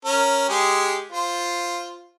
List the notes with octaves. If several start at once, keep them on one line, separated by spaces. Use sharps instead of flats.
C#4 A#4
G#3 G4 G#4
F4 C5